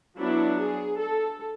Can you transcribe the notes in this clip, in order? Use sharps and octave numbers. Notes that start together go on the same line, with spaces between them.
F#3 B3 D4 E4
G#4
A4